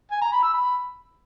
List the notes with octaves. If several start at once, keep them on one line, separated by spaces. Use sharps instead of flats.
G#5
A#5
B5
E6
B5